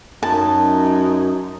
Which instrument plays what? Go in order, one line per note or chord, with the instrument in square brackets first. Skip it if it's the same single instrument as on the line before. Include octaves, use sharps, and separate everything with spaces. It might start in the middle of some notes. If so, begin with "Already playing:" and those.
[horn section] F#2 D#4 [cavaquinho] A5